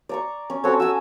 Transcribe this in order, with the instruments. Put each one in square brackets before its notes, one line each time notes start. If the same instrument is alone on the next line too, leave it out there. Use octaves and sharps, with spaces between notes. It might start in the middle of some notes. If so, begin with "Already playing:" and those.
[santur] D5 A#5 C#6
C#4
[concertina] C4 F#4 C#5 [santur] A4 A5
[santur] F#4 F#5 G#5 [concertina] E6